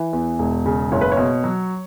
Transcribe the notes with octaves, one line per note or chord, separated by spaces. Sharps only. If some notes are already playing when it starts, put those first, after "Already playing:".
Already playing: E3
E2
E1
C#3
F#1 C#5
B4
C#5
B2
F#3